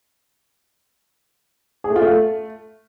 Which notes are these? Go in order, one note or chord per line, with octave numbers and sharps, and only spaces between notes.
G#4
A3
F4
A3